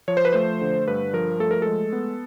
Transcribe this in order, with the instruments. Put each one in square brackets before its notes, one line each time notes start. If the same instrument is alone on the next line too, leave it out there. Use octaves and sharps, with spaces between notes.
[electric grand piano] F3 C#5
C5
B4
A3 C5
D3
G2 B4
F3 A#4
A3 A4
A#4
G#3 A4
B3